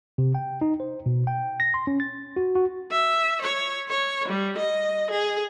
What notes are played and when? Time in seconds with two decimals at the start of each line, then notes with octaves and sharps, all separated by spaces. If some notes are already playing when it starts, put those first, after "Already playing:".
0.18 C3
0.35 G5
0.61 D#4
0.80 C5
1.06 B2
1.27 G5
1.60 A#6
1.74 C6
1.87 C#4
2.00 A6
2.36 F#4
2.55 F#4
2.91 E5
3.42 C#5
3.89 C#5
4.28 G3
4.58 D#5
5.11 G#4